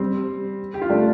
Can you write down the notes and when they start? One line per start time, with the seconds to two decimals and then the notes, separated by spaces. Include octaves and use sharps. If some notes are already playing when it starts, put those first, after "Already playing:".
Already playing: G3 C4
0.74 G4
0.81 F4
0.90 A3 D4